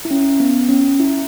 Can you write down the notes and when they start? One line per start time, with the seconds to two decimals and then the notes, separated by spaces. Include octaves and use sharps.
0.05 E4
0.11 C#4
0.40 B3
0.69 C#4
1.00 E4